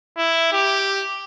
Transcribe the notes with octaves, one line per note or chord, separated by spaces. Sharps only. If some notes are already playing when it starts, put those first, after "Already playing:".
E4
G4